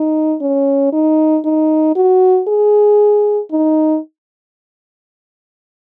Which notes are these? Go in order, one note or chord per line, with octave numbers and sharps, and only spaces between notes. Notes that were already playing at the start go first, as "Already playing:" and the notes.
Already playing: D#4
C#4
D#4
D#4
F#4
G#4
D#4